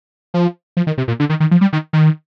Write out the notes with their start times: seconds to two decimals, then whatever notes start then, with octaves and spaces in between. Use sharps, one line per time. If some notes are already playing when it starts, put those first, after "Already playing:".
0.34 F3
0.77 F3
0.87 D#3
0.98 C3
1.08 A#2
1.20 D3
1.29 D#3
1.40 D#3
1.51 F3
1.61 G3
1.73 D#3
1.93 D#3